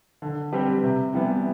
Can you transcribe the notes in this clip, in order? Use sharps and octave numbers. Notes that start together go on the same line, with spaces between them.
D3
G3 C4 G4 B4
C3
E3 G3 B3